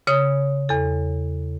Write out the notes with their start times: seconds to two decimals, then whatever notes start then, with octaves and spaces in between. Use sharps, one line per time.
0.07 C#3 C#5 D#6
0.69 E2 A4